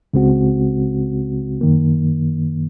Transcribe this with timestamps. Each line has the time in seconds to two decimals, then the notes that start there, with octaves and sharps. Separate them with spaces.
0.14 C#2 C#3 G#3 C4 F#4
1.61 F#2 D#3 A#3